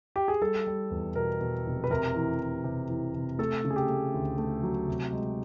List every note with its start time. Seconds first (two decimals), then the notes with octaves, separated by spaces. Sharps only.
0.16 G4
0.28 G#4
0.42 G3 A4
0.67 G3
0.91 E2
1.15 B2 A#4
1.41 B2
1.66 F1
1.84 B4
1.91 C3 A#4
2.16 E3
2.40 E3
2.64 C3
2.89 E3
3.14 C3
3.39 A3 A4
3.64 C#3
3.70 G#4
3.76 G4
3.89 A3
4.14 D2
4.38 A3
4.63 F#3
4.88 C3
5.13 G#3